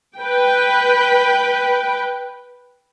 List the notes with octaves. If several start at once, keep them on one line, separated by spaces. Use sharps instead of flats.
B4 G5